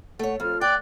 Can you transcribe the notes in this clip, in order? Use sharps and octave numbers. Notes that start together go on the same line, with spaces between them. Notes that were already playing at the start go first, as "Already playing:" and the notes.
A3 C#5 F#5
F2 F4 A4 F6
D5 G5 F#6